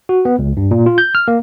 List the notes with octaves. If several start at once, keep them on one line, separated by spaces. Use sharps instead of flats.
F#4
B3
C#2
G2
A#2
F4
G6
F6
A#3